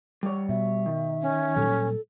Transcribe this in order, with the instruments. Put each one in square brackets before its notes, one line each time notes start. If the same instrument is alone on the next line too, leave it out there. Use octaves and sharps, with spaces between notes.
[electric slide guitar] G3 C#5
[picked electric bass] B2 [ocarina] E5
[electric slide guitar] D#3
[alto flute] C#4
[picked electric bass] A#2 F#3 G3 [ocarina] A4